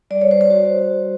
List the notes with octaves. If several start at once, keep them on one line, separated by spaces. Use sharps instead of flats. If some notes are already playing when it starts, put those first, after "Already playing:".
G3 D5
C#5
G3 C5
C5
F#4